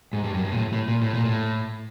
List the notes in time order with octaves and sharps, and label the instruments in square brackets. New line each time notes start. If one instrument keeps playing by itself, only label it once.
[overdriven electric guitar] G#2
G2
F#2
G2
A#2
A2
A2
A#2
A2
A#2
A2